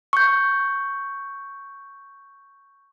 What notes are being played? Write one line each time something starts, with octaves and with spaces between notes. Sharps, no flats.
C#6 G6